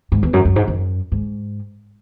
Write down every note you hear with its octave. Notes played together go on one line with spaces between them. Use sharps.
G#2
E2
F#2
F#2
G#2
F#2
G#2